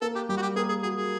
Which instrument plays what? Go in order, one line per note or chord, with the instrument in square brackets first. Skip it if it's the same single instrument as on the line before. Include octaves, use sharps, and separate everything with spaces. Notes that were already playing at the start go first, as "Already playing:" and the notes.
[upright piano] A#3 [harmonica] A4
[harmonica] G4
[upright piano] G3 [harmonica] G4
[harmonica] F#4
G4
[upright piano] A#3 [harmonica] G#4
[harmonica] G#4
[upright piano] F#4 [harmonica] G#4
[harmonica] G#4